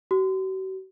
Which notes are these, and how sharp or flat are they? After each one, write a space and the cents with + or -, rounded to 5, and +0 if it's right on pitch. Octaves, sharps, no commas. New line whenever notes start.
F#4 +45